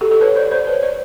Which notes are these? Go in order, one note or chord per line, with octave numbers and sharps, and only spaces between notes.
G4 A4
G4 A4
B4 C#5
C5 D5
C5 D5
B4 C#5
C5 D5